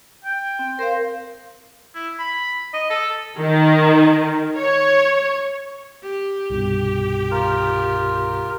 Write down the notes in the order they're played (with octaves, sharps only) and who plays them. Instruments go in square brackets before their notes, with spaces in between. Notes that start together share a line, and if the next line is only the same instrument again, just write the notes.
[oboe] G5
[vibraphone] C4
[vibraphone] A#4 F5 [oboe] C5
[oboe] E4
B5
D#5
A4
[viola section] D#3
C#5
[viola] G4
[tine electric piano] C2 G2 B2
[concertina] F4 A#4